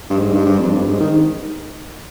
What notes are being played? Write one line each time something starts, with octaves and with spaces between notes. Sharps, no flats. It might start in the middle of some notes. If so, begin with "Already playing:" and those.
G2
G#2
G2
G2
F2
G2
G#2
D#3